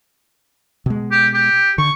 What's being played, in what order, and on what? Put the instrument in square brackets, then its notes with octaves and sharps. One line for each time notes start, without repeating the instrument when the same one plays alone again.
[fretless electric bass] B2 G#3
[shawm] G4
G4
[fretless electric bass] D3 [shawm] C#6